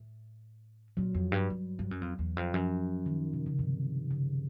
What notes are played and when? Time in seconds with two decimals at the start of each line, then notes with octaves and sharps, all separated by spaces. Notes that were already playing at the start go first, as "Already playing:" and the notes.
Already playing: A2
0.97 A#2 F#3
1.15 F2
1.32 G2
1.50 G2
1.79 G2
1.91 F#2
2.01 F2
2.19 E2
2.37 F2
2.54 F#2 F3
3.06 D#3
3.33 C3
3.46 C#3
3.59 G2 C3
4.11 C#3